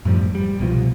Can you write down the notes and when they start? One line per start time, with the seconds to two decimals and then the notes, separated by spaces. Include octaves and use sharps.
0.05 F#2 A2 F3 G3
0.35 G3
0.59 C2 B2 F3